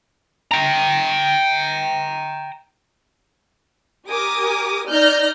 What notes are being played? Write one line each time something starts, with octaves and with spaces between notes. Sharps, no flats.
G5 A#5
G4 A#4 G#5 D6 D#6
D#4 D5 F6 G6 A#6